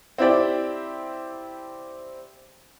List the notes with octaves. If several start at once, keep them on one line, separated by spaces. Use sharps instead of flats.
C4 E4 G4 D5 G5